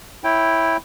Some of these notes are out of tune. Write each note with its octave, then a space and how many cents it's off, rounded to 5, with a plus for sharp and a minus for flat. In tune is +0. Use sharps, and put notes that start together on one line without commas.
E4 -5 C#5 -15 G5 +0